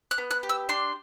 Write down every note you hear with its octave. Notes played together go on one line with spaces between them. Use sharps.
F#6
B3
F#6
G4
E6
D4 C6